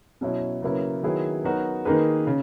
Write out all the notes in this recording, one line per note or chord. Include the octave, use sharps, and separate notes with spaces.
B2 F#3 C#4 E4
C#3 F#3 A#3 E4 B4
D#3 F#3 B3 E4 G#4
F#3 B3 D#4 F#4 A#4
D#3 A#3 D#4 G#4 B4
C#3